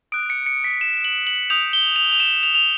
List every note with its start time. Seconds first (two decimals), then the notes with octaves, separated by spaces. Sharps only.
0.12 D#6 F#6 D7
0.30 C#7
0.46 C#7
0.64 B6
0.81 E7
1.05 F#7
1.27 F#7
1.50 D#6 G6 F7
1.73 G7
1.96 F7
2.13 F7
2.20 E7
2.43 F7
2.55 F7